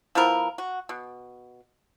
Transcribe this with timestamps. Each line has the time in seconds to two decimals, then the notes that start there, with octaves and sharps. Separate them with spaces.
0.15 F3 B3 E4 A#4
0.58 F#4
0.89 B2